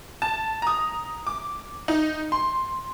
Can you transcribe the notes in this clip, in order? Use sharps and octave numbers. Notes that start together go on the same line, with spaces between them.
A5
A#5 D#6
D6
D#4
C6